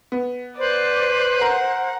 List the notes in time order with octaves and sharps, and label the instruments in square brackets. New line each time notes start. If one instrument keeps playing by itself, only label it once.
[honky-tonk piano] B3
[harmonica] B4 [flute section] C5 [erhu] D5
[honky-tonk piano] A#4 [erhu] F#5